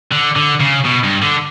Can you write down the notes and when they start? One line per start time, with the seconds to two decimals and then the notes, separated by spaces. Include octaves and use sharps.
0.11 D3
0.36 D3
0.61 C#3
0.85 B2
1.04 G2
1.23 D3